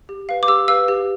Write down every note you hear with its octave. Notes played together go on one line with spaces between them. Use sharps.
G4
B4 F5
D6
G4 E6
B4 F5 E6
G4